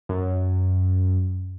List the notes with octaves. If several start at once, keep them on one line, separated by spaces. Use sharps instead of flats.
F#2